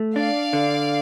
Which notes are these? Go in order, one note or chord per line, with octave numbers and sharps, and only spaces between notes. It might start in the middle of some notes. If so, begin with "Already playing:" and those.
Already playing: A3
D4 D5 F5
D3